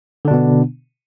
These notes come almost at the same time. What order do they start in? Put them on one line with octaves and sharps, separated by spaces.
D3 D4 B2 B3